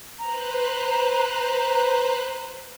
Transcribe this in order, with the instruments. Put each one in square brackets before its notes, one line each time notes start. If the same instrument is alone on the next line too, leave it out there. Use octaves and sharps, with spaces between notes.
[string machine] B4 C5 F#6 [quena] A#5